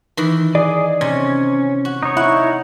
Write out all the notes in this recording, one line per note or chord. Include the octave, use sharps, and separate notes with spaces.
D#3 E3
G#4 D5 D#5
C3 C#4
F#4
D#4 C#5
E4 F#5